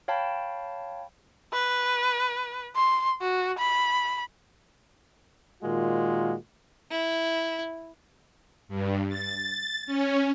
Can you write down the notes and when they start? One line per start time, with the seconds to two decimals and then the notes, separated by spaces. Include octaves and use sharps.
0.08 C#5 F5 G5 A5 B5
1.53 B4
2.76 C6
3.21 F#4
3.58 B5
5.62 A#2 D#3 G#3 F4 F#4
6.91 E4
8.69 G2
9.09 A6
9.86 C#4